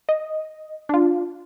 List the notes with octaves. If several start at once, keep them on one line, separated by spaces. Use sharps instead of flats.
D#5
D4 F4